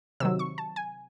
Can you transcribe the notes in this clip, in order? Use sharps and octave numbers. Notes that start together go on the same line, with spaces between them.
C3 D#3 F#3 E6
C#6
A5
G#5